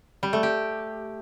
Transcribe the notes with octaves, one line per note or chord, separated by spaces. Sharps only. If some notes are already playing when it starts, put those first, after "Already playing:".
G3
A3
G4